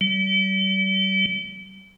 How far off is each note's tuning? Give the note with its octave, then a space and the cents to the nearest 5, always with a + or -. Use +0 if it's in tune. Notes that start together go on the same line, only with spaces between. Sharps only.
G3 -35